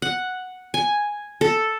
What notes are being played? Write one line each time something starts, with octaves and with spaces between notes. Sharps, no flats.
F#5
G#5
A4